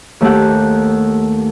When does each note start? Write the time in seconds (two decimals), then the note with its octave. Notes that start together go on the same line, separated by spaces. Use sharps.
0.21 D#2 A3 G4 F#5